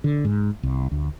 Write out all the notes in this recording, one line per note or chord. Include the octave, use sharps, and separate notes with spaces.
D3
G#2
C2
D2